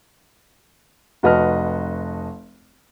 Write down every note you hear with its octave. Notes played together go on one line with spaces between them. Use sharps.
F1 F#4 B4 D#5 A5 F6